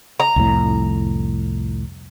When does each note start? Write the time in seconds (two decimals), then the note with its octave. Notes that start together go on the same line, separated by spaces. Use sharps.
0.20 A#5
0.36 C2 F2 A2